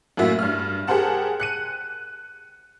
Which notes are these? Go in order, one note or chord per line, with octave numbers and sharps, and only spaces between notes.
F#2 A2 A#3 F#4 E5
G2 F6
G4 G#4 A#4 C5 F#5 A5
F#6 C#7 D#7